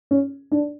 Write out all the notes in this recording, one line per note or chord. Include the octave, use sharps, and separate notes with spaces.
C#4
D4